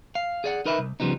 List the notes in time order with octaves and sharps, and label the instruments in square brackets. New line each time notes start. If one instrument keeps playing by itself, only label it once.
[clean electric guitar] F5
G#4 D5 F#5
D#4 A#4 B4 D#5 E5
C2
C#3 E3 F3 G3 B3 D#4